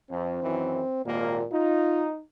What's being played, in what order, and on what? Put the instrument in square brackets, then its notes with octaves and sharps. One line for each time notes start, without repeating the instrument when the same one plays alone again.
[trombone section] F2 [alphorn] C4
[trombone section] F#2 D#3 E3
[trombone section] G#1 D#2 A#3 [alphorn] A#2
[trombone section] D#4 [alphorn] F4